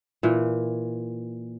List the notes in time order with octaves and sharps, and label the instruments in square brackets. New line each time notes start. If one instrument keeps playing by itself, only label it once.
[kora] A#2 E3